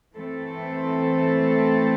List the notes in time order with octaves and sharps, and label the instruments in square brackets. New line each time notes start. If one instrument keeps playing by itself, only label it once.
[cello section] E3 A3 C4 A4